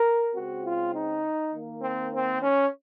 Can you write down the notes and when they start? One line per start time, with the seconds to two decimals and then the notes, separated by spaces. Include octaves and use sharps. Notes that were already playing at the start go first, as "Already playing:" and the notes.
Already playing: A#4
0.34 C#3 G#3 C4 F#4
0.64 F4
0.93 D#4
1.52 D#3 A#3
1.81 C4
2.12 C4
2.41 C#4